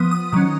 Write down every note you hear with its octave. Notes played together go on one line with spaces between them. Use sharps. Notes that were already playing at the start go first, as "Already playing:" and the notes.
Already playing: F3 B3 D#6
D#6
D#3 F#3 C#4 D#6